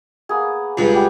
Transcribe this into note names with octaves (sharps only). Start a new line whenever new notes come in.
A#3 B3 G#4
C#2 G2
B3 G4 B4